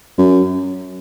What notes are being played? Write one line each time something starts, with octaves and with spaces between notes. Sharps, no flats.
F#2